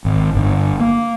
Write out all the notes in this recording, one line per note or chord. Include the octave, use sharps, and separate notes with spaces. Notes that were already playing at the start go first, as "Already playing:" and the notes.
G#1
G1
A#3